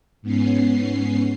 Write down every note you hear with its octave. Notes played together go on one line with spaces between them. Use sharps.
G#2 B3 C#4 C7